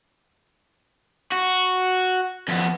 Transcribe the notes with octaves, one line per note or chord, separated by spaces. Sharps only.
F#4
F2 B3